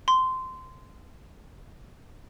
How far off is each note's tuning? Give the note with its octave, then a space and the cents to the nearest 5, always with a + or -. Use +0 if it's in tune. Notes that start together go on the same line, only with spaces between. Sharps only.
C6 -15